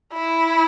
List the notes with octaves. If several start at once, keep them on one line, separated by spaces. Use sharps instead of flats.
E4